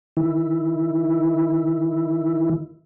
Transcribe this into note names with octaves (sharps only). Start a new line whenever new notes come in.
D#3 E4